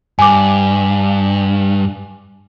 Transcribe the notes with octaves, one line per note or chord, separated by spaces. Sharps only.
G2 G#5 D6